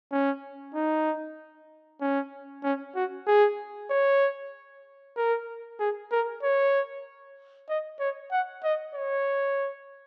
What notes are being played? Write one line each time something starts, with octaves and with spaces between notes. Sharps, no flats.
C#4
D#4
C#4
C#4
F#4
G#4
C#5
A#4
G#4
A#4
C#5
D#5
C#5
F#5
D#5
C#5